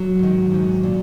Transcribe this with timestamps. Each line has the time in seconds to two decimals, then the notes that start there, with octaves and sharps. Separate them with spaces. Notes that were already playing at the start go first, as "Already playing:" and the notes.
Already playing: F#3
0.19 G#2 D#3
0.51 G#2 D#3
0.83 A#2